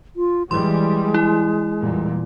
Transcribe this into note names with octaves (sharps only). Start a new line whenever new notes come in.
F4
E3 G3 G#3 C6
E4
E2 A#2 G3